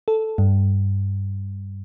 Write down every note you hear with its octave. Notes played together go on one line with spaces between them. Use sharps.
A4
G2